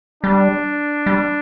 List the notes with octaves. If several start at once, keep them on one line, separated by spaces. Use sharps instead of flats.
G3 D4
G3